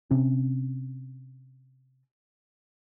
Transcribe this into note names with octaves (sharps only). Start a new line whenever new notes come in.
C3 C4 C#4